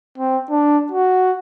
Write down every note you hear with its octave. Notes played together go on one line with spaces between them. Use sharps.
C4
D4
F#4